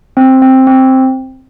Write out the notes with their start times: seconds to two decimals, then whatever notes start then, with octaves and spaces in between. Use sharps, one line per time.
0.17 C4
0.42 C4
0.67 C4